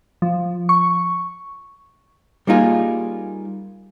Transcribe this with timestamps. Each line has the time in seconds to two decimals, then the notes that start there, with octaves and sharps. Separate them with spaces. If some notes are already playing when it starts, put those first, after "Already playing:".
0.22 F3
0.69 C#6
2.47 G3 A#3 D#4 F4 G#4